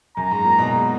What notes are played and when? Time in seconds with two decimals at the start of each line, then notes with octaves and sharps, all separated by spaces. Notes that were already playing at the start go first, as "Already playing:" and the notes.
0.17 F#2 A#5
0.31 G#2
0.45 A#2
0.58 B2
0.71 G#2